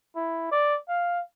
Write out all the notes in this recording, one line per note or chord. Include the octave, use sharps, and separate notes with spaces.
E4
D5
F5